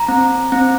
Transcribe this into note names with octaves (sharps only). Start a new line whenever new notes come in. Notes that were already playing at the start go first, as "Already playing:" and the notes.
Already playing: A#5
C4
C4